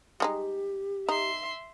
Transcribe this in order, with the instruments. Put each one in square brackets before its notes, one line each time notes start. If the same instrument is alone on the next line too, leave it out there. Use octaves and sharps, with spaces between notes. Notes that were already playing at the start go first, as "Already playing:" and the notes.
[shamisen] G3 G#3 D#4 [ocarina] G4
[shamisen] D#4 [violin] E5 C6